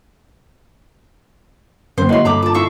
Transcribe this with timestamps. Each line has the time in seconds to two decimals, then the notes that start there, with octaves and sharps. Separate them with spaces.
1.98 F#2 D3 A#3 C5
2.09 G#3 E4 F#4 B4 C#5 D#5 C6
2.25 G2 A4 A#5 B5 D6
2.42 F4 A5 D6
2.54 D#4 E4 E5 C6 C#6